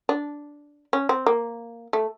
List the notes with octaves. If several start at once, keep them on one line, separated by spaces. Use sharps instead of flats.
D4
C#4
C4
A#3
A3